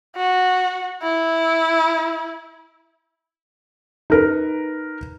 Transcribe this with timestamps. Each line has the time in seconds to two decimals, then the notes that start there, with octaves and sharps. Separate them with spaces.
0.16 F#4
1.03 E4
4.10 D#4 A#4 B4